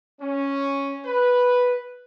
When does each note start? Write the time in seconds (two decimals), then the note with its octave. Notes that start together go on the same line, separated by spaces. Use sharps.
0.21 C#4
1.05 B4